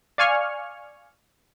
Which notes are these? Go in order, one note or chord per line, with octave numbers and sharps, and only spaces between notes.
D5 F5 G#5 C#6 F6